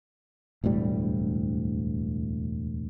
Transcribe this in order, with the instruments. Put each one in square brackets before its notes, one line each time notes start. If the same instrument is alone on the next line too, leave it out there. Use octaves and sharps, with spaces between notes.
[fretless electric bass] E1 D2 A2 G3